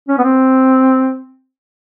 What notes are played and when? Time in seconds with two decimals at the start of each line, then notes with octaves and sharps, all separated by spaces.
0.09 C#4
0.18 B3
0.24 C4